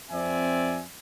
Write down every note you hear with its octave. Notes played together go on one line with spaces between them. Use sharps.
F2 C4 D5 E5 G#5